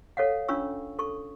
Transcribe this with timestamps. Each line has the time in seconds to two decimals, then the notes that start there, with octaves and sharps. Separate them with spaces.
0.17 A4 C#5 F5 F#5
0.49 C#4 D4 F4 C#6 E6
0.99 A4 C#6